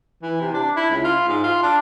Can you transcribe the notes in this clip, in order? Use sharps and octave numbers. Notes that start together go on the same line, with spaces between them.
E3
C3
D4
E4
C#2
F4
G#2
F4
D4